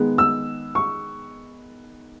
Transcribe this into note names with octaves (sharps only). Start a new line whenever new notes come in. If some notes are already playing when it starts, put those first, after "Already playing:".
Already playing: D#3 G#3 B3
E6
C#6